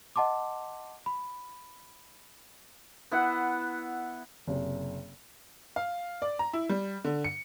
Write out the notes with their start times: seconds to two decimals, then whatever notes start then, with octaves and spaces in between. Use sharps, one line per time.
0.16 D#5 F#5 A5 C6 D6
1.06 B5
3.11 B3 E4 F#5
4.47 F#1 C3
5.76 F5
6.22 D5
6.39 A#5
6.53 E4
6.69 G3
7.05 D3
7.24 C#7